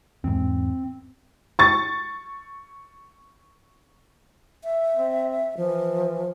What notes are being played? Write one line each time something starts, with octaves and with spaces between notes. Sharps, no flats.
E2 G#2 C4
C#6 A6
E5
C4
E3 F3